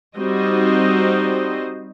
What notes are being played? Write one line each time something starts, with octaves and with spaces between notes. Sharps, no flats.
G3 C4 D#4 F#4 C5 D#5